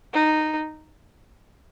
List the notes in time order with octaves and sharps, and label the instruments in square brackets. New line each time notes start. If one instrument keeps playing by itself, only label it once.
[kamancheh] D#4